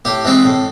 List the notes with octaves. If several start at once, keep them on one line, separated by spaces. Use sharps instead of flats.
A2 G4
E3 G#3 C4
A2